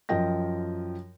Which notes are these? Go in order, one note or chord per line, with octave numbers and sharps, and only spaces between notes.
F#2 F3 D#5 G5 A#6